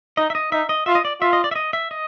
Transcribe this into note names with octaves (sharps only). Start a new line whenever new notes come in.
D#4 D#5
E5
D#5
D#4 E5
D#5
F4 E5
D#5
D5
F4 E5
D#5
D5
E5
D#5
E5
D#5